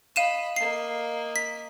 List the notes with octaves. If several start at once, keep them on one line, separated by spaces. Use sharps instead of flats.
D#5 F5 B5 D#7 E7
A#3 D#5 C7
B6